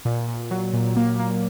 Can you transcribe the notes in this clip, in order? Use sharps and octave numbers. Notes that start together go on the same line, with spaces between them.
A#2
A#2
F#3
A#2
A#3
A#3